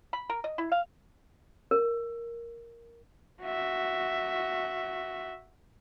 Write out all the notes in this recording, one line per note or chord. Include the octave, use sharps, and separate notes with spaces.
B5
A#4
D#5
E4
F5
A#4
F#4 E5